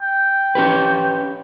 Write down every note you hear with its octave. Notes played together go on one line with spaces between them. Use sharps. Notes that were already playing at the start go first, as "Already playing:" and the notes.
G5
C#4 G4 B4